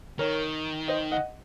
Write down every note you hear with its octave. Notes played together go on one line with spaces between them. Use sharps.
D#3 A#4 C#5
C5 D#5
D#5 F#5